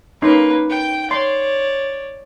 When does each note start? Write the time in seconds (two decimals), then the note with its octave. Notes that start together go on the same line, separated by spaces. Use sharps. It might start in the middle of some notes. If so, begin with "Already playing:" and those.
0.22 A#3 C#4 D#4 B4 C6
0.70 G5
1.11 C#5 D5 C6